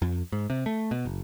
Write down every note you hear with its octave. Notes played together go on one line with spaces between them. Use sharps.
F2
G#2
C3
A3
B2
F#1